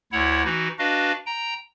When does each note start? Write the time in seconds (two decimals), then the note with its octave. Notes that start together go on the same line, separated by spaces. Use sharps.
0.12 D2 E4 C#5 F#5
0.44 E3 D#4 F#4
0.79 D4 F#4 B4 D#5 F5
1.26 G5 A#5